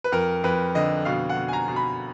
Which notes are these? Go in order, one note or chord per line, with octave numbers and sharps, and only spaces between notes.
B4
F2 A#4
F2 B4
D3 D#5
B2 F5
F#5
B2
G#5
A#5
B2
B5